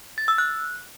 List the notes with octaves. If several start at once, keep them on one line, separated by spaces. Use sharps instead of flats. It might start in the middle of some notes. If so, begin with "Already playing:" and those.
A6
E6
F#6